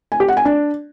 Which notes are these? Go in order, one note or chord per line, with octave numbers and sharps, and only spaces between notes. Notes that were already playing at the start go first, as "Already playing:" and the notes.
G#5
G4
F#5
G#5
D4